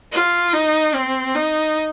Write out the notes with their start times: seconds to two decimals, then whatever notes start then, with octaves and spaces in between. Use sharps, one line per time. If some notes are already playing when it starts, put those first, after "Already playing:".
0.12 F4
0.53 D#4
0.95 C4
1.35 D#4